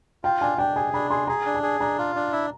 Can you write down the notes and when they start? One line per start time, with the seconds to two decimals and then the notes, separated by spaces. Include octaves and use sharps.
0.24 F4 G5
0.41 D4 G#5
0.58 D4 G5
0.76 G#4 G#5
0.94 D4 B5
1.11 G#4 C6
1.27 G#4 A#5
1.46 D4
1.55 A5
1.63 G#4
1.80 D4 A#5
1.98 F4
2.16 D4
2.32 E4